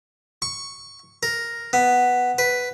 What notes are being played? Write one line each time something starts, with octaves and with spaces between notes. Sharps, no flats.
C#6
A#4
B3
B4